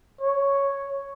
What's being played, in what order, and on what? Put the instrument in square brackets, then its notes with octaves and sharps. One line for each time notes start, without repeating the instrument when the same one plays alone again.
[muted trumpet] C#5